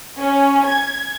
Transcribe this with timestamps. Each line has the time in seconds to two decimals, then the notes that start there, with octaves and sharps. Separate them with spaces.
0.19 C#4
0.66 G#6